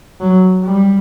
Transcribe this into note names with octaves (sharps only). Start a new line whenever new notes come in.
F#3
G3